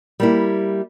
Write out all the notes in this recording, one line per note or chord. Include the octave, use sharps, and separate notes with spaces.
G3 A#3 E4